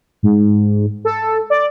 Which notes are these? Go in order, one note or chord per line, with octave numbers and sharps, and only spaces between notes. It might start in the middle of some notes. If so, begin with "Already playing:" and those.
G#2
A4
D5